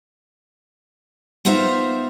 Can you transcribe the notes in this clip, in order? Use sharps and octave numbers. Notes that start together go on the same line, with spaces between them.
B3 D#4 F4 C5 E5 F5